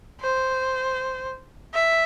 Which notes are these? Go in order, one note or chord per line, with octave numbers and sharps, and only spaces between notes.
C5
E5